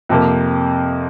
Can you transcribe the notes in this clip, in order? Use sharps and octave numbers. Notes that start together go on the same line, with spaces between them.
F2 C3 F3 A#3